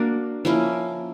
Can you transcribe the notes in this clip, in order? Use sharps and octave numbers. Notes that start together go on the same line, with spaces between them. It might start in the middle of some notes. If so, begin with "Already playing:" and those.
Already playing: A#3 D4 F#4
F3 A#3 C#4 E4